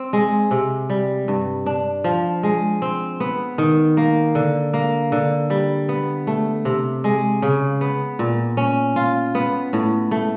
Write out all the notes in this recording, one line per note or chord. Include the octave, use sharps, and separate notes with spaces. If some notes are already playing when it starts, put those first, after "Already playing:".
Already playing: C4
G#3
C3
G3
G2
D4
F3
G#3
C4
B3
D#3
A#3
D3
A#3
D3
G3
B3
A3
C3
G#3
C#3
B3
A#2
C#4
F4
B3
A2
A3